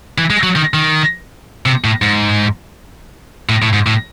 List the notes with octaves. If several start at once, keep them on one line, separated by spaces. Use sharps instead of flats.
E3
G#3
F#3
D#3
D#3
C3
A2
G#2
A2
A2
G#2
A2